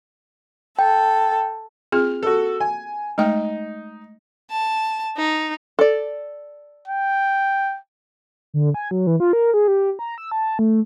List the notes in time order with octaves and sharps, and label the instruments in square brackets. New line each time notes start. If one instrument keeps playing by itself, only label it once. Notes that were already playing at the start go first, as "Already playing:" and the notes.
[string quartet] A4 [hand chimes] G5
[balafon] C4 F4 G#4 [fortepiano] F6
[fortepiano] F#4 A4
G#5
[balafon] G#3 A3 G5 [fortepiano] D#4
[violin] A5
D#4
[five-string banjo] A4 D5
[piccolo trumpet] G5
[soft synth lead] D3
G#5
F#3
E3
F4
A#4
G#4
G4
A#5
E6
A5
A3